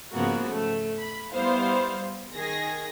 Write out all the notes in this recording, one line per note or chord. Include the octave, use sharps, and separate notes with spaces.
G#2 C#3 F3 A#3 B3 F#4
A3
B5
G3 B3 E4 C5 F5
D#3 G#4 A#6